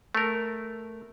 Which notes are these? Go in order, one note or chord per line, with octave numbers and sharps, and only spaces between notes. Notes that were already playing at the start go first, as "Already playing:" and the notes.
A3 A#4